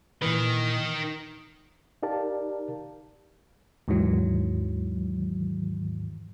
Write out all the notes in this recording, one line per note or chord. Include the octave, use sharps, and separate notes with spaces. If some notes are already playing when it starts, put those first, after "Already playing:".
A#2 D#3 E3 B4
D#4 G4 A#4 D5 F5 A5
D#2 G#2 D#3 E3 F#3